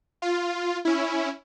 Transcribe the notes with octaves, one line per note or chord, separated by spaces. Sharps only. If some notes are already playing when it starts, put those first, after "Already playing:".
F4
C#4 E4